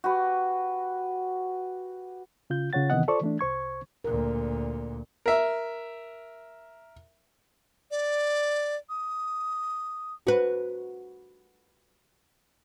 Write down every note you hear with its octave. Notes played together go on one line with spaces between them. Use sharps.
F#4 G4 B4
C#3 F4 G6
C#3 F4 C#5 F#5 A6
C3 D#3 E3 B3 D#5 F#5
F4 A4 C5 D5 C#6
E3 A3 D4
C2 C5 C#6 G#6
D2 A#2 A#4
A#4 E5
D5
D#6
F#4 B4